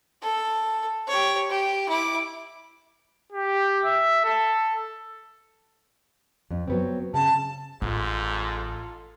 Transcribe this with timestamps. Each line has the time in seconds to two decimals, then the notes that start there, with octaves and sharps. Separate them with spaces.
0.22 A4
1.07 G4 C#5
1.50 G4
1.89 E4 D6
3.32 G4
3.84 E5
4.25 A4
6.51 F2
6.68 F#3 B3 C4
7.14 C#3 A5
7.82 A1 G#2 F4 A4